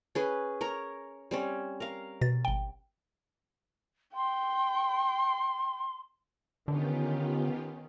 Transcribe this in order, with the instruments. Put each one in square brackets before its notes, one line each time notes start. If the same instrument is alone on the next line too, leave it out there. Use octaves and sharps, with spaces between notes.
[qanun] C#4 G#4 B4
A#4 C#5 A#5
G3 C4 C#4
A#4 F5
[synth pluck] B2 A6
G#1 G5
[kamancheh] G5 [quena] C6
[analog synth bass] D3 [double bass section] D#3 C#4 [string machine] B3 F4 G4